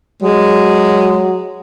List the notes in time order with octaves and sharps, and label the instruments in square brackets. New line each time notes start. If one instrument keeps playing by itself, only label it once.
[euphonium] F#3 [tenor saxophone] G#3